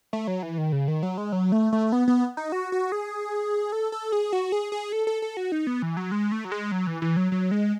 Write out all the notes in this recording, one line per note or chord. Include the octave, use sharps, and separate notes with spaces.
A3
F#3
E3
D#3
C#3
D#3
F#3
G#3
F#3
A3
A3
B3
B3
D#4
F#4
F#4
G#4
A4
A4
G#4
F#4
G#4
G#4
A4
A4
A4
F#4
D#4
B3
E3
F#3
G#3
A3
F#3
G#3
F#3
E3
E3
F#3
F#3
G#3